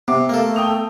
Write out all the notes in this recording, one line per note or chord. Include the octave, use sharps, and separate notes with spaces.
C3 B3 D6
A3 A#3 A4
G5 D#6 F7